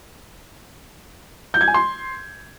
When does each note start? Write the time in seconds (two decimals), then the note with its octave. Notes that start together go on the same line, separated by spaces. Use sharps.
1.54 G6
1.61 G#6
1.68 G#5
1.74 C6